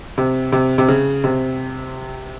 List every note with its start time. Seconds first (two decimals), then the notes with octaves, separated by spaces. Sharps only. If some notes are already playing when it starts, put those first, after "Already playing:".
0.18 C3
0.52 C3
0.78 C3
0.88 C#3
1.24 C3